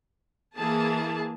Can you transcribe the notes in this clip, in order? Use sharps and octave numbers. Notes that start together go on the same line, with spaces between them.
E3 A#3 G#4 A5